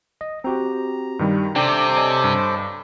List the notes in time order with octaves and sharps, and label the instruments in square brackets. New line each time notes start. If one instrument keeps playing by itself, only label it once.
[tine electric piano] D#5
[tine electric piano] C4 F#4 G4 [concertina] A#5
[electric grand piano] G2 D#3 G3
[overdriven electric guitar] C3 [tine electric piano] D4 [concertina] A4 C5 D6 [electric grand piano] D5 G5
[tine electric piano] C#5 D#5 G#5
[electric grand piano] G2